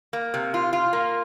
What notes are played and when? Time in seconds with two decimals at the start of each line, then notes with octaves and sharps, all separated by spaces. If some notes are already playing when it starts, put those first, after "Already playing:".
0.13 A#3
0.34 C3
0.54 F4
0.73 F4
0.93 A#3